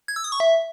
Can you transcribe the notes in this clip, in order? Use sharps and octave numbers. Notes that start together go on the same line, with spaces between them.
G#6
E6
D#6
C#6
E5